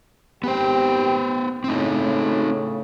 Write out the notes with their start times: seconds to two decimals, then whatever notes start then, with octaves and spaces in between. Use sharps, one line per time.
0.44 G#1 B3 G4 C5 G5
1.64 A2 C#3 C4 D#4